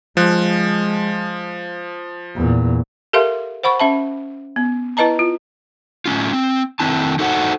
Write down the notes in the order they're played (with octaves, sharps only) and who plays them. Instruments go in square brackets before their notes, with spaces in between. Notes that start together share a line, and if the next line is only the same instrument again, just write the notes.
[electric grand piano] F3 F#6 [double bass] G#3
[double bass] E2 A#2
[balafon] G4 A4 A#4 E5 F5 C6
C5 F#5 B5 C#6
C#4 E5 A5
B3
E4 B4 D#5 A5 A#5
F4
[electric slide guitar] A2 C#4 F4
C4
D#3 C4 E4 A5
D#4 F#4 A4 C5 F#5